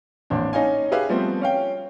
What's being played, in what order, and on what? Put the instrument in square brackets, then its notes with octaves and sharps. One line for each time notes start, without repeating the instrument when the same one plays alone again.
[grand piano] A1 A#3 C4 D4
C#4 D#4 F5 G#5
G4 G#4 B4 E5 F5 G#5
F3 G3 A3 B3 C4
C#4 F5 G5